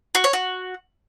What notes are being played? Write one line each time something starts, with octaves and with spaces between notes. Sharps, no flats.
F#4
C#5
F#4